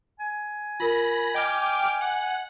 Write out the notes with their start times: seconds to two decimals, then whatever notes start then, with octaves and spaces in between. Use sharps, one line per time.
0.19 G#5
0.80 F4 A#4 B5 A#6
1.35 D#5 G5 D6 F6
2.01 F#5